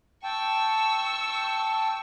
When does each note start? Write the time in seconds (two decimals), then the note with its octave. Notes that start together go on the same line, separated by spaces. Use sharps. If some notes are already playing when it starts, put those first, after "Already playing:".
0.24 G5 A5 C#6 E6